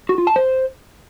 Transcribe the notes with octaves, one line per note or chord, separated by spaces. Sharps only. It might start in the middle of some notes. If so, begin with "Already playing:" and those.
F#4
F4
A5
C5